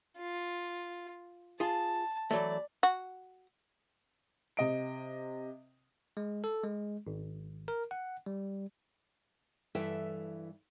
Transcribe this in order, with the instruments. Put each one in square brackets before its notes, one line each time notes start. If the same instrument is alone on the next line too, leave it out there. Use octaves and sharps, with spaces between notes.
[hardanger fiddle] F4
[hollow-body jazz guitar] F4 G#4 [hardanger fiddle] A5
[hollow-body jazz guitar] E3 F#3 A3 [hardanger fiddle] D5
[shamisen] F#4
[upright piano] C3 D#5 D7
[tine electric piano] G#3
A4
G#3
G#1
A#4
F#5
G3
[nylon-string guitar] G2 E3 E4 A4 E5 G5